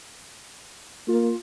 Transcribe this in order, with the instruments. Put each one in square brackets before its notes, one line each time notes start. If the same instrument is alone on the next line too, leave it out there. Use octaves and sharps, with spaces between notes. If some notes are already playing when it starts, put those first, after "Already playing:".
[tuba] A#3 [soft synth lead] F4